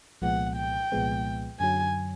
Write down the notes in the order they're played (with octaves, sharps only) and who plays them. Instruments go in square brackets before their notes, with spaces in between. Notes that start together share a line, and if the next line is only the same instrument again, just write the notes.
[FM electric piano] C2 A#2 F3 G#3 B3 [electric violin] F#5
[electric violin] G5
[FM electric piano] C2 A#2 F3 G#3 B3
[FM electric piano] F#2 D3 F#3 [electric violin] G#5